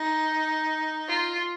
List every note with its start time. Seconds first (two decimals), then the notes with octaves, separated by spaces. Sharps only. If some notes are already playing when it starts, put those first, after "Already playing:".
Already playing: D#4
1.08 F4